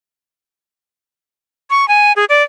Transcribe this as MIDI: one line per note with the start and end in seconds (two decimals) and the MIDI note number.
1.70 1.88 85
1.88 2.12 80
2.16 2.25 68
2.29 2.43 74